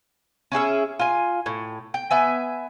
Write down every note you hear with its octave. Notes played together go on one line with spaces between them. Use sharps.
C#4 E4 G#4 E5
F4 G#5
A2
G5
B3 E5 G#5